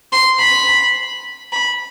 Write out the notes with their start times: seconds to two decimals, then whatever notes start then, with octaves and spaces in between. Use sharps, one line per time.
0.12 C6
0.40 B5
1.53 B5